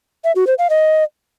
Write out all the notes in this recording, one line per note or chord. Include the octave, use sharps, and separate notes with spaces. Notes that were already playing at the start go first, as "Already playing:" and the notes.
E5
F#4
C5
F5
D#5